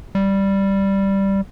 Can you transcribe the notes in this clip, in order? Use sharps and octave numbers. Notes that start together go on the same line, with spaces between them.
G3